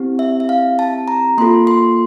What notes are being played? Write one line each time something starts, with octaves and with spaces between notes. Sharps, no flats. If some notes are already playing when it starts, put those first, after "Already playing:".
Already playing: C4 E4 G4
E5
E5
F5
A5
A#5
A#3 F4 A4 C6
C6